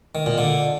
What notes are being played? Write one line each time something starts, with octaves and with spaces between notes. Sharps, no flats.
D#3
A#2
D3